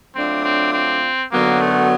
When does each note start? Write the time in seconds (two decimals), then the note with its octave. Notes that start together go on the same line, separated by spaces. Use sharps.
0.15 F#3 A3 C4 D4 F4
0.44 C4
0.73 C4
1.32 F#2 D3 F#3 A#3 B3
1.61 A3